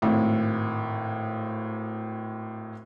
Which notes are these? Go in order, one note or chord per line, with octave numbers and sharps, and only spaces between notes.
G#1 A2